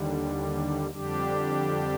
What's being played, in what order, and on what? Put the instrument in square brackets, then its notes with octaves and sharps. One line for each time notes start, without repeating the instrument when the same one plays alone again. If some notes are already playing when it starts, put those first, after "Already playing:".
Already playing: [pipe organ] D#2 D3 G3
F2 D3 G3 D4 G4